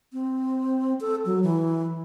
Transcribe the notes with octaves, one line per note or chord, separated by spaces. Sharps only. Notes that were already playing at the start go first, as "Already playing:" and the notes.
C4
A4
F#3
E3